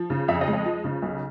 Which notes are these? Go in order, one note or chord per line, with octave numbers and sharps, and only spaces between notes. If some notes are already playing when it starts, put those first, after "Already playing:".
Already playing: F3
C#3
F2 E5
D#5
G#3
D#5
F3
C#3
B1